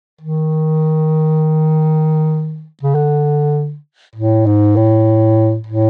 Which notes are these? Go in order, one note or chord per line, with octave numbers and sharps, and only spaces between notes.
D#3
C#3
D3
A2
G#2
A2
A2